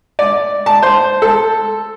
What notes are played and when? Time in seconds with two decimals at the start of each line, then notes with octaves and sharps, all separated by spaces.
0.19 D5
0.66 A5
0.82 C5
1.22 A4